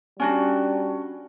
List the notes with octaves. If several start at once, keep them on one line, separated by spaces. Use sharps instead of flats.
G3 C#4 D4 F#4